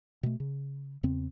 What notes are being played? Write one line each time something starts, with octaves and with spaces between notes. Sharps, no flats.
B2 A3
C#3
E2 C#3 C4